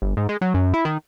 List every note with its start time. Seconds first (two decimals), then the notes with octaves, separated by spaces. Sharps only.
0.02 G1
0.17 G#2
0.29 G#3
0.41 F#3
0.54 F#2
0.74 E4
0.85 D#3